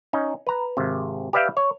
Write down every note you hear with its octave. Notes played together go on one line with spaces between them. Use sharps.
C#4 D#4
B4 A#5
G#1 C3
G4 B4 D5 E5 F5 G5
C#5